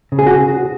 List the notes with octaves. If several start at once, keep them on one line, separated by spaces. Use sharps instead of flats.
C#3
G#4
F#4